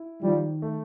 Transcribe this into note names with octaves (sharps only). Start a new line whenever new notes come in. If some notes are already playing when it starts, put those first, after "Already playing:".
Already playing: E4
D#3 F3 G3
A3